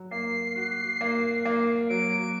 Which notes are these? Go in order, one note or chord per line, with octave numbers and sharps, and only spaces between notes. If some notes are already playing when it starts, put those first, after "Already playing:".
Already playing: F#3
A#3 C7
F#4
A#3
A#3
F#3 D7
D7